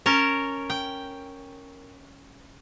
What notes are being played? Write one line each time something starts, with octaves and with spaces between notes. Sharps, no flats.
C#4 A#4 A5
G5